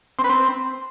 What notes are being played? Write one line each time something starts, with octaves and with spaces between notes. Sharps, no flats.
C4
B4
C4